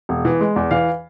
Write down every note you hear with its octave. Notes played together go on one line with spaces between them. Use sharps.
E1
E3
G#3
E2
E3 F5